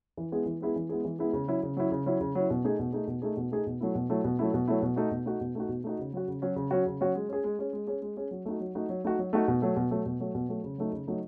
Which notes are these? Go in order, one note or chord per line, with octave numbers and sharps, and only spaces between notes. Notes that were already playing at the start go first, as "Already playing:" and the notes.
E3
G#3 B3 E4 G#4
E3
G#3 B3 E4 G#4
E3
G#3 B3 E4 G#4
E3
G#3 B3 E4 G#4
C#3
F#3 C#4 E4
C#3
F#3 C#4 E4
C#3
F#3 C#4 E4
C#3
F#3 C#4 E4
B2
A3 D#4 G#4
B2
A3 D#4 G#4
B2
A3 D#4 G#4
B2
A3 D#4 G#4
B2
F#3 A3 E4
B2
F#3 A3 E4
B2
F#3 A3 E4
B2
F#3 A3 E4
B2
A3 D#4 F#4
B2
A3 D#4 F#4
B2
A3 D#4 F#4
B2
A3 D#4 F#4
C#3
F#3 C#4 F#4
C#3
F#3 C#4 F#4
C#3
F#3 C#4 F#4
C#3
F#3 C#4 F#4
G#3
C#4 G#4
G#3
C#4 G#4
G#3
C#4 G#4
G#3
C#4 G#4
F#3
A3 D#4 F#4
F#3
A3 D#4 F#4
F#3
A3 D#4 F#4
F#3
A3 D#4 F#4
B2
F#3 A3
B2
F#3 A3
B2
F#3 A3
B2
F#3 A3
C#3
F#3 A3 D#4
C#3
F#3 A3 D#4